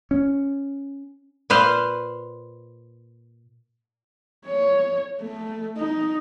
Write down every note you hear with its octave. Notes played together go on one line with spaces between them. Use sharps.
C#4
A#2 B4 C5 F5
C#5
A3
D#4